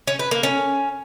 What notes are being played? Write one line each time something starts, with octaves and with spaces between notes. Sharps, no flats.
C#4
B4
A#3
C#4